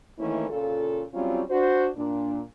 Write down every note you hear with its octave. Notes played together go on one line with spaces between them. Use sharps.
D#3 E3 A3 A#3 C#4 E4
A#2 C#3 F4 A4
F#3 G3 C4 C#4 F4
D4 F#4 C5
A#2 D4